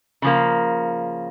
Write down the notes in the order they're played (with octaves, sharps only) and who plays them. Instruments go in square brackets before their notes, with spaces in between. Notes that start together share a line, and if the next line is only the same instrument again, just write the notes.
[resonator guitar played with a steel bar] C#3 F3 A#3